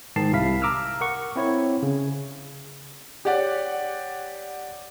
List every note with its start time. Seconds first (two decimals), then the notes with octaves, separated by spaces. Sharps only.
0.16 G#2 D#3 A5 C7
0.32 C2 C3 E4 F5 B6
0.62 A#5 D6 E6 F6
1.01 A#4 F#5 C#6
1.36 C4 E4 C#5
1.83 C#3
3.25 G4 C#5 D5 F#5